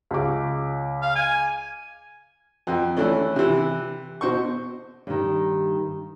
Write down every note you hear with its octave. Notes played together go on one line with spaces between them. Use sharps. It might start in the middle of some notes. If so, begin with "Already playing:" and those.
C#2 D6
F5
G#5
F2 C4
E3 A3 C#4 D4
C3 E3
B2 C5 C#6
G2 D#3